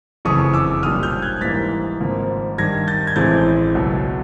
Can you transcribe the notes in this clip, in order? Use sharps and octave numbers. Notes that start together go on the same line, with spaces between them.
F#1 F2 C#3 E3 A3 C#6 D#6
D6 E6
B1 A#2 G3 D#6 F6
F6 G6
F#6 G#6
G#2 E3 G3 A#3 A6 B6
G#1 G#2 F3 A#3
G2 D#3 G3 G#6 A#6
G6 A6
G#6
A1 A2 E3 G#3 C4 G6 A6
C#2 B2 F#3 A3